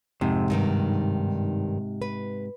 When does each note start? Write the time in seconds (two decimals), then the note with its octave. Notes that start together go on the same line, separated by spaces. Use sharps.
0.21 F2 G#2 C3
0.50 G2 D#3 G3
2.02 B4